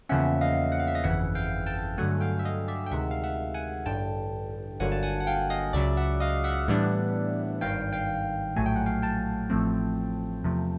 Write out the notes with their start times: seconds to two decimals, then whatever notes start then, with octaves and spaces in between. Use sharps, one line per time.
0.09 E2 C#3 F3 A#3 C#4 E5 F#5
0.41 D#5 F5
0.72 F#5
0.80 F5
0.87 E5
0.95 D#5 F5
1.04 G1 F2 C#3 E3 E5 F#5
1.35 F5 G5
1.66 G5 A5
1.98 G2 D3 F#3 A3 F#5 G#5
2.21 F5 G5
2.39 E5
2.45 D#5 F5
2.68 D5 E5
2.86 G5
2.91 D2 C3 D#3 G#3 E5 F#5
3.11 F5
3.24 E5 F#5
3.54 F#5 G#5
3.86 A1 G2 D3 G5 A5
4.80 G1 G2 D3 F#3 A#3 F#5 G#5
4.92 A5
5.03 F#5 G#5
5.20 F#5
5.27 F5 G5
5.50 D#5 F5
5.73 C#2 C#3 F#3 D5 E5
5.97 E5 F#5
6.20 D#5 F5
6.44 E5 F#5
6.68 A2 E3 G3 B3 D4
7.61 G#1 G2 D#3 F5 G5
7.93 F5 G5
8.56 A#1 A2 F#3 A3 G#5
8.66 G5
8.76 F#5
8.86 F5 G5
9.02 G5 A5
9.50 A1 A2 F3 A3 C4
10.44 E2 C3 F3 A3